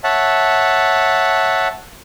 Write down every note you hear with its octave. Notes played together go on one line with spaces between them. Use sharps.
C#5 E5 F#5 A5